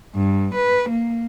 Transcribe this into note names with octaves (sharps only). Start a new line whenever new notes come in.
G2
B4
A#3